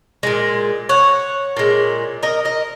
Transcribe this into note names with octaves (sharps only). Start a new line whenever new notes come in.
A#2 G#3
C#5 F#5
A#2 G#3
A#4 D#5
A#4 D#5